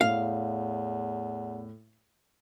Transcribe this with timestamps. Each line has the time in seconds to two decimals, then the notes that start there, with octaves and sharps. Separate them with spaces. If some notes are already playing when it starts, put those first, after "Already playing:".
0.01 E2 A2 F5